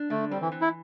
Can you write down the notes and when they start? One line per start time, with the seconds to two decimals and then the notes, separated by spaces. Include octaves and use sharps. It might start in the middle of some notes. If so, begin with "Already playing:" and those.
Already playing: D4
0.10 D3 A3
0.31 G3 C4
0.41 E3
0.52 E3
0.62 E4